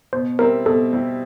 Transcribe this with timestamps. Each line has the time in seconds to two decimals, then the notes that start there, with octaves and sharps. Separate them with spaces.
0.13 B2 C5
0.39 G3 C4 E4 A#4
0.66 B2 A4
0.93 G3 C4 E4